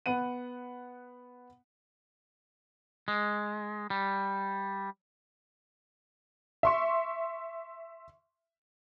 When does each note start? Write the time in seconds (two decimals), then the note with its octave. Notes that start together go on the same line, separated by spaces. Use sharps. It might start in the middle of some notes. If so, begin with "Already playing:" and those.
0.06 B3 F#5 D#7
3.08 G#3
3.90 G3
6.63 E5 C6 C#6